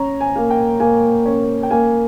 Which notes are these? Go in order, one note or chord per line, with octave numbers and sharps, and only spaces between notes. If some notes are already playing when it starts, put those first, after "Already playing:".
Already playing: C#4 A#5
G#5
A#3
G5
A#3 G#5
C#4
G5
A#3 G#5